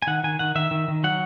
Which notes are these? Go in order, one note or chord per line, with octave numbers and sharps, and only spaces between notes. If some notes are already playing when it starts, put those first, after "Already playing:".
G#5
D#3 F#5
D#3 G#5
D#3 F#5
D#3 E5
D#3
D#3
F#3 F#5